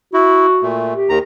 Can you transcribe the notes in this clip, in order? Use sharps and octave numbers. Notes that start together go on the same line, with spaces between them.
E4 F#4
A#2 A3
G4
D#2 D#3 A#5